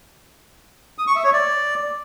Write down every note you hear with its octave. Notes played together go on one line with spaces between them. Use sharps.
D#6
C#6
E5
C#5
D5